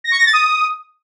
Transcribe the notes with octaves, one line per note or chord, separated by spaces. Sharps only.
A#6
C#6
A#6
A6
D#6